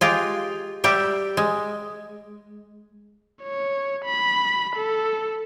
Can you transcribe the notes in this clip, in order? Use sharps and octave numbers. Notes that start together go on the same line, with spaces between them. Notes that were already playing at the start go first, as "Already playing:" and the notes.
G#3 F4 G4
G3 G4 E5
G#3
C#5
B5
A4